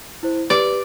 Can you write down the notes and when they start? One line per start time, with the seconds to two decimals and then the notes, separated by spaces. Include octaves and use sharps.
0.23 E4 C5
0.50 G4 B4 D5